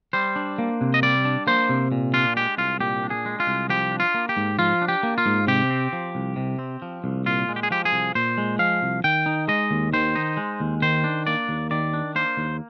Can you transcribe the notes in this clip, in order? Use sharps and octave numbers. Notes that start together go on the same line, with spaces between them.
G3 C5
D4
A#3
C3
D#5
G3 D5
D4
A#3 C5
C3
A#2
D4 F4
G#3 G4
C2 F4
A#2 G4
D4
G#4
G#3
F4
C2
F3 G4
D4
F4
A#3
G4
G#2
F3 F4
D4
G4
A#3
F4
G#2
C3 G4
C4
F3
C2
C3
C4
F3
C2
A#2 F4
G#3
G4
G#4
F3 G4
G#4
C2
A#2 C5
G#3
F3 F5
C2
D#3 G5
D#4
G#3 D#5
D#2
D#3 C5
D#4
G#3
D#2
D#3 C5
D4
A#3 D5
D#2
D#3 D5
D4
A#3 C5
D#2